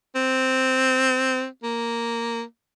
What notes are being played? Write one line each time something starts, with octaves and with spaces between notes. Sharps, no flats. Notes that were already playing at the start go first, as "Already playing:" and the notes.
C4
A#3